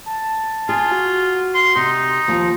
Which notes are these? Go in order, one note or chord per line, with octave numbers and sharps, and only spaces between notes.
A5
F4 G#4
F#4
C6
C3 D#4 C6
D#2 F3